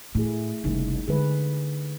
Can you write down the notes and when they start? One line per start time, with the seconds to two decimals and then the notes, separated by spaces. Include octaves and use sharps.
0.15 A2 A3 E4 G#4
0.64 F#1 C2 D#4
1.07 D3 G#3 G#4 B4